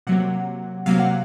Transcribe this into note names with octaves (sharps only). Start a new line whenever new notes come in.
C3 F#3 A#3 F#5
C3 F#3 A#3 F5
F#5